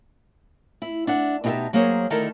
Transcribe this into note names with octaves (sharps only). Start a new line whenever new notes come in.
E4
D4 E5 F#5
B2 D#4 G4 A#4 E5 A5
F#3 A#3 G#4 C5 C#5
D2 D#3 E4 A4 A#4 D#5